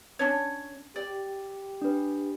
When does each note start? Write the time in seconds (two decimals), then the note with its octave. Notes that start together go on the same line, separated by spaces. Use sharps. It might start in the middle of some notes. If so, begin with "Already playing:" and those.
0.19 C#4 D4 C#5
0.96 G4 D5
1.82 D4 B4